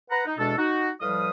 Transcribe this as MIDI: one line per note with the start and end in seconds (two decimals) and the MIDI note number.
0.10 0.24 71
0.10 0.24 78
0.10 0.24 82
0.26 0.33 63
0.38 0.53 40
0.38 0.53 47
0.38 0.53 56
0.38 0.53 62
0.38 0.53 69
0.57 0.89 63
0.57 0.89 66
1.01 1.31 45
1.01 1.31 53
1.01 1.31 55
1.01 1.31 71
1.01 1.31 77
1.01 1.31 87